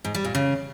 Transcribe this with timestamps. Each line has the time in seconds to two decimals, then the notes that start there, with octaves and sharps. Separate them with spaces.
0.05 G#2
0.15 G3
0.25 A#2
0.35 C#3